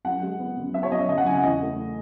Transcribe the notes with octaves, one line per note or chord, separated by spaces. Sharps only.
F#2 F#5
G#3
B3
F#2
B3 E5
C#5
F#2 D#5
E5
F#2 D#5
F#5
C#3 G#5
F#5
E2 D#5
A3